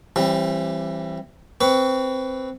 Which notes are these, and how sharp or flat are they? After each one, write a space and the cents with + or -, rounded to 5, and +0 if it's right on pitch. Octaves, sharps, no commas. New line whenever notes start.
E3 +25 G3 +0 C4 +35
C4 +0 B4 +5 C#6 +20